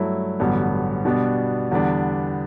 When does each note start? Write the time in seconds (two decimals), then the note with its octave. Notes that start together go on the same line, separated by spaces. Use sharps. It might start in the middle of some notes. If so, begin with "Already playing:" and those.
Already playing: G2 F#3 A3 E4
0.40 A1 G2 D3 F#3 B3
1.05 B2 G3 B3 D4
1.71 E2 D3 G3 B3 D4